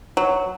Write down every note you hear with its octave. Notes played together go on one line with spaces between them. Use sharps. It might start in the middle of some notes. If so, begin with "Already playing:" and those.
F#3